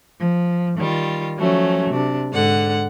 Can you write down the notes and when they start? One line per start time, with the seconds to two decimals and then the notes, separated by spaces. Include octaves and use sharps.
0.20 F3
0.78 D#3 G3 F4
1.38 F3 F#3 A3 C#4
1.91 C3 D4
2.33 G#2 D3 F#5